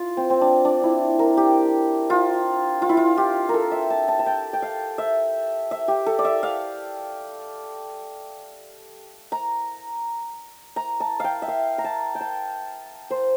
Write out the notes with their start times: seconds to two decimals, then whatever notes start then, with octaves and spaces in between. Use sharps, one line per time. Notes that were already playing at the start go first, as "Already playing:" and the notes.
Already playing: F4
0.17 C4
0.30 C4
0.41 D4
0.65 D4
0.83 E4
1.19 A#4
1.37 G4
2.10 F4
2.82 F4
2.89 E4
2.97 F4
3.17 G4
3.49 A#4
3.54 A4
3.71 E5
3.90 A5
4.08 A5
4.19 A5
4.26 G5
4.53 G5
4.62 F5
4.98 E5
5.71 E5
5.88 G4
6.06 A4
6.19 D5
6.25 E5
6.43 F5
9.32 A#5
10.76 A#5
11.00 A5
11.20 F5 G5
11.42 E5
11.48 F5
11.78 A#5
11.84 A5
12.15 G5
12.21 A5
13.11 C5